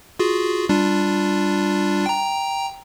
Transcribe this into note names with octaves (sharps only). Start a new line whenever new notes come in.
F4 F#4 G#4
G3 D4 F4
G5 A#5